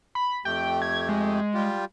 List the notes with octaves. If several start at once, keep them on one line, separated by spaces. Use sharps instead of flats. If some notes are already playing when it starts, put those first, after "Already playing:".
B5
F2 A3 G4 G5
G#6
G#3
G3 F4 G4